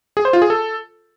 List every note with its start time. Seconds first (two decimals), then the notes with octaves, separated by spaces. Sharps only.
0.17 G#4
0.25 C5
0.33 F4
0.42 G#4
0.50 A4